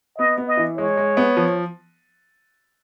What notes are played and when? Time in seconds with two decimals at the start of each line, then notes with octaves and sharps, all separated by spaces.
0.18 B3 D#5
0.37 B3
0.47 D#5
0.57 E3
0.78 G#3 C#5
0.97 G#3
1.17 B3
1.37 F3